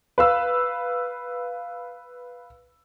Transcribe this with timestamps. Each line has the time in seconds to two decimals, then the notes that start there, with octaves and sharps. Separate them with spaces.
0.18 B4 F5 E6